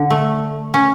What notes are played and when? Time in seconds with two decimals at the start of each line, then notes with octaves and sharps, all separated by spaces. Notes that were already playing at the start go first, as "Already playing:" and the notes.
Already playing: D3
0.10 A3
0.74 C#4